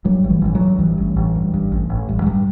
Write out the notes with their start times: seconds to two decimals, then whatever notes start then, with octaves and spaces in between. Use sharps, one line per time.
0.05 G2 F#3
0.24 A1
0.30 E3
0.42 A1 E3
0.55 F#3
0.60 G2
0.79 G2 E3
0.98 A1
1.16 A1
1.35 G2
1.54 G2
1.72 A1
1.90 A1
2.09 G2
2.22 F#3
2.26 G2 G3